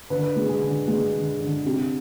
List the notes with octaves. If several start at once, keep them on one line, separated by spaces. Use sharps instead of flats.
D3 B4
G#3
G#4
D3
G#3 G#4
D3
D3
C3 G4